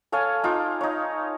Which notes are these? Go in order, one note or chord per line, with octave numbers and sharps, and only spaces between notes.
A4 C#5 F5 G#5
D#4 F4 D6
D#4 C#5